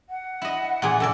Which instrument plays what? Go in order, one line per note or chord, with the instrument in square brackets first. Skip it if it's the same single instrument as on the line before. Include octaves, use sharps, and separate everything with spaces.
[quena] F#5
[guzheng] E4 D#5
A#2 E3 G#4
[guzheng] F#2 C#3 D5 [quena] A4